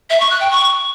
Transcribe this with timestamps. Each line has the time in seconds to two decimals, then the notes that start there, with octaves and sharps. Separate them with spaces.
0.10 E5
0.20 C#6
0.30 F#6
0.41 G5
0.51 C#6